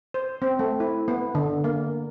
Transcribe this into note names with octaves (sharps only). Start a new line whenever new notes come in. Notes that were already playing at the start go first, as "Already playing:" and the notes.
C5
C4
A3
E4
B3
D3
A#3